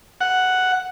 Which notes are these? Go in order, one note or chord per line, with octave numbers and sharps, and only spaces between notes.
F#5